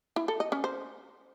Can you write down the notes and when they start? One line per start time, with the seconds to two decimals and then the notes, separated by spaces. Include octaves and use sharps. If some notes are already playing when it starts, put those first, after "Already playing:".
0.16 E4
0.28 A4
0.40 D#5
0.52 C#4
0.64 C5